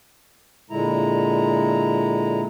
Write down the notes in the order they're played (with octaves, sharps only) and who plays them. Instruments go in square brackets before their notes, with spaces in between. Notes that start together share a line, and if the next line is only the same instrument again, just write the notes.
[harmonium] A#2 D3 G#3 E4 A#5